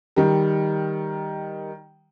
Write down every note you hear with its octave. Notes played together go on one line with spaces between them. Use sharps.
D#3 G3